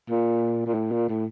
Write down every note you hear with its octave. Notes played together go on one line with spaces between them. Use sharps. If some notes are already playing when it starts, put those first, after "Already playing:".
A#2
A#2
A2
A#2
A2